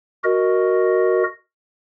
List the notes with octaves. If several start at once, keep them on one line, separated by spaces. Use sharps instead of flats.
F#4 A#4 D#5